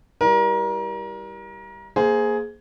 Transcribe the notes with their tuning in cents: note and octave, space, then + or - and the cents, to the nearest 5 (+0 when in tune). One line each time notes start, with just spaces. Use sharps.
G3 +0 E4 +0 A#4 +30
A#3 +0 G#4 +10 C5 -10